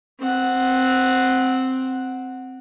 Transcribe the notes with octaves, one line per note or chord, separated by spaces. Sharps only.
C4 F#5